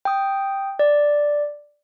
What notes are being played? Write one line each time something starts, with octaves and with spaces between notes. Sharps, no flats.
G5 D#6
D5